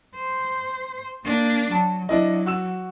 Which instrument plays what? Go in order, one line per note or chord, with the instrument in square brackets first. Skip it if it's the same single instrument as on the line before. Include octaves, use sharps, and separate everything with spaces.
[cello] C5
A#3 D4
[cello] F#3 [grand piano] A5
[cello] F#3 [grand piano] D4 E4 D#5
[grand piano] F#4 E6 E7